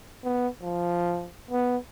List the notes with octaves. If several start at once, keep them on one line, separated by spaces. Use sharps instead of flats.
B3
F3
B3